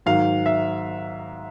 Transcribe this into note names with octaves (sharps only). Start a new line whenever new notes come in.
G#2 D#3 F#3 F5
E5